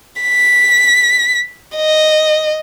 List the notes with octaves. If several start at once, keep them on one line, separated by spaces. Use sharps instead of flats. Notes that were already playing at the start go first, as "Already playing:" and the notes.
B6
D#5